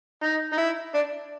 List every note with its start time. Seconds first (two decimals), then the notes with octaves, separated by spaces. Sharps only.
0.23 D#4
0.53 D#4
0.58 E4
0.95 D4